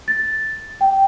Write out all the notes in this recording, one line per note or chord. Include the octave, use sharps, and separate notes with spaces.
A6
G5